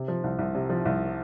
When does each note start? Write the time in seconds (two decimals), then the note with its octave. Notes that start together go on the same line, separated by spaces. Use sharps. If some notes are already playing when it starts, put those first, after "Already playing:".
Already playing: C3
0.08 F3
0.24 C2
0.39 C2
0.55 C3
0.70 F3
0.85 C2